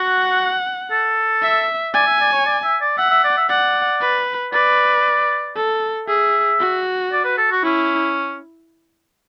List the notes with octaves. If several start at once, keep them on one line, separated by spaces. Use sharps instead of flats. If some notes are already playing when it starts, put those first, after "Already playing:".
Already playing: F#4 F#5
A4
E5
D5 G#5
E5
D5
C#5
D5
E5
D5
E5 F#5
E5
D5
E5
D5 F#5
B4
B4 D5
A4
G#4 E5
F#4
D5
B4
A4
F#4
C#4 E4